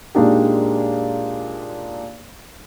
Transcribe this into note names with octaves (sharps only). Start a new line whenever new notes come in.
A#2 G#3 A#3 D4 D#4 G4